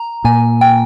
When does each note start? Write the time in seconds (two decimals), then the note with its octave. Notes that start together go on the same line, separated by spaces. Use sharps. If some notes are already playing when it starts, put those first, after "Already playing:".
Already playing: A#5
0.24 A#2 G#5
0.61 G5